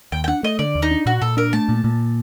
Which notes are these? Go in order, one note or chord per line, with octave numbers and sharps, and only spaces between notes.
D#2 G5
G5
D4 F#5
A3 D#5
D3 D5
D#2
D#4
D4
A#2 F#4
A#2 A4
D4 A#4
A3 A5
A#2
A#2